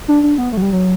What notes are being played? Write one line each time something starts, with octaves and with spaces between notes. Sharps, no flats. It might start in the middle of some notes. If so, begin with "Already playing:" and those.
D4
D4
B3
A3
F#3
G3
F#3